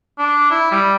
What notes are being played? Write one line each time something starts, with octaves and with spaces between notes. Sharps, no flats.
D4
E4
G3